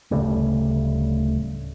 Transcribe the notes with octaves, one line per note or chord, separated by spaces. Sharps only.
D1 C#3 G3 A3